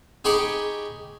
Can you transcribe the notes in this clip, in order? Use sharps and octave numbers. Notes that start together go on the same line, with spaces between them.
D#4 G4 G#4 B5 C#6 D6